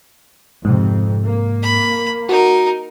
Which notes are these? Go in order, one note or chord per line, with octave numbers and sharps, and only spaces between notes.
F2 G#2 C3
A#3
B5
D#4 F#4 A#4